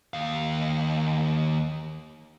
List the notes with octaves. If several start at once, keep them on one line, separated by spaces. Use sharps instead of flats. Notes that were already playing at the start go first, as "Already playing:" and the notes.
D#2 F5